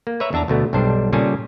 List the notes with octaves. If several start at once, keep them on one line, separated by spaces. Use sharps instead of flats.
A#3
B4 C#5 E5 A#5
E2 D4 E5 A5 A#5
D2 B2 A3 B3
B1 G2 G3 D4 C5
A#2 C#3 G3 G#4 A4 G#5